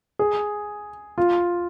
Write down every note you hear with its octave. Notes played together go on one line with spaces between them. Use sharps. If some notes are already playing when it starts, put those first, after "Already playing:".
G#4
F4